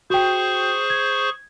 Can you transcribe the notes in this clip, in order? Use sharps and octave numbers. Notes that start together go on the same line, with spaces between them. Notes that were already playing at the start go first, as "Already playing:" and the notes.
F#4 G#4 C5 G5 C#6
G#6